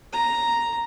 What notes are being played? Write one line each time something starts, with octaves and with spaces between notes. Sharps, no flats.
A#5